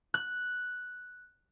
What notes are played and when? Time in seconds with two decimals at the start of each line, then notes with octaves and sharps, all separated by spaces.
0.14 F#6